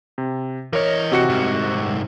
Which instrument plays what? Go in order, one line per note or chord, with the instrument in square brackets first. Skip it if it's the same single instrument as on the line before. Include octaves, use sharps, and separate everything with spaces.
[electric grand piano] C3
[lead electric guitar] E3 D#5 [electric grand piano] A#4 C#5
[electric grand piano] C3 F#4 C#7
[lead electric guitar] C2 G#2